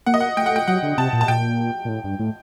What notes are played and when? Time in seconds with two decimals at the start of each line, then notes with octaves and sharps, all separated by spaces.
0.06 A#3 F#5
0.14 D#5
0.20 F#5
0.37 A3 G5
0.46 F#5
0.56 G5
0.68 F#3 F#5
0.83 D3
0.98 C3 A5
1.13 A#2
1.21 A5
1.28 A#2 G5
1.85 A#2
1.89 A2
2.04 G2
2.19 A2